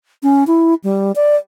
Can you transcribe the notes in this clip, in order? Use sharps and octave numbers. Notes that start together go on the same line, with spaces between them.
C#4
E4
G3
D5